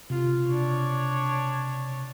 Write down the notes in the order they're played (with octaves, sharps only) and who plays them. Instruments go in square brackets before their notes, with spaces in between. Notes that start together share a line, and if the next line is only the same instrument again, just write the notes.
[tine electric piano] C3 [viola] F4
[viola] D4 C#5